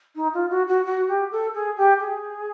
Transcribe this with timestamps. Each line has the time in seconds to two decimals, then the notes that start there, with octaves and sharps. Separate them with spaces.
0.15 D#4
0.34 F4
0.50 F#4
0.68 F#4
0.85 F#4
1.08 G4
1.32 A4
1.54 G#4
1.77 G4
2.00 G#4